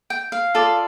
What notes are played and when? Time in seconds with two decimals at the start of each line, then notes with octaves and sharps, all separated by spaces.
0.10 G5
0.32 F5
0.54 F4 A4 D5